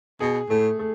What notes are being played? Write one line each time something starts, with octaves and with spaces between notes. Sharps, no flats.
B2 G#4
A2 A3
A3